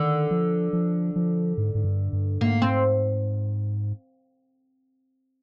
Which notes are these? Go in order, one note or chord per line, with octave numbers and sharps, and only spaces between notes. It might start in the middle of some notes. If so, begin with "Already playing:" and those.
Already playing: D3 D#3
F3
F3
F3
G#2
G#2
G2
G2
G#2 A#3
C4